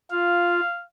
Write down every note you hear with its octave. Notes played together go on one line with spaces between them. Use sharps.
F4 F5